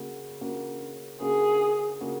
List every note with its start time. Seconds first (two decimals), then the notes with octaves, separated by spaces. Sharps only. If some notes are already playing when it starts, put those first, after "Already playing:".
Already playing: C#3 A#3 F#4
0.41 C#3 A#3 F#4
1.21 C#3 A#3 F#4 G#4
2.01 C#3 A#3 F#4